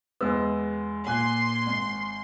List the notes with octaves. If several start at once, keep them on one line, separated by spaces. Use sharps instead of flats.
E2 G#3 B3 E6
A#2 G#5 C6 F#6
G#1